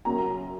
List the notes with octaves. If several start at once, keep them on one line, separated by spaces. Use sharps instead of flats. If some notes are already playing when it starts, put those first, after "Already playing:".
F#2 C#3 F#3 C#4 A#5